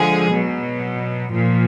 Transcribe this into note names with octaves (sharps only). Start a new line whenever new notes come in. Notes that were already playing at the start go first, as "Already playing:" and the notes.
Already playing: D3 F3 G#3 G#4
B2 F#3
A#2 F3